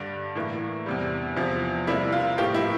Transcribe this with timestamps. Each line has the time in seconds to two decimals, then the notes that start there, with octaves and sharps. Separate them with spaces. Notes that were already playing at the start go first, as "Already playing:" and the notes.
Already playing: G2 D3 G3 D4
0.35 A2 E3 A#3
0.86 E2 C3 G3
1.36 E2 C3 F3
1.87 C3 G3 A#3 E4
2.12 F4
2.38 A2 F3 A#3 G4
2.54 E4